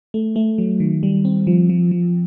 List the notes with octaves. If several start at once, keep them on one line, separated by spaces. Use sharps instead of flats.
A3
A3
F#3
D#3
G3
C4
F3
F3
F3